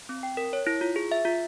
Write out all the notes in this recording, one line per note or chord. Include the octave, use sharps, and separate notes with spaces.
C4
G5
A#4
C#5
E4
F4
G#4
E5
F4